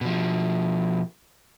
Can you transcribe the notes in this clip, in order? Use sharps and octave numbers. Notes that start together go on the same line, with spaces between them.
B2 F3